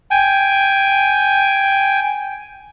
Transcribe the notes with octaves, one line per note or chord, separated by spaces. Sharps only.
G5 G#5